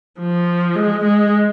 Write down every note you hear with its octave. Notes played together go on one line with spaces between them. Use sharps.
F3
G#3
G#3